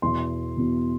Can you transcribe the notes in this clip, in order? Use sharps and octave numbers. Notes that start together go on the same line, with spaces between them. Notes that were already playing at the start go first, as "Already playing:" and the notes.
E2 B2 C6
E2 B2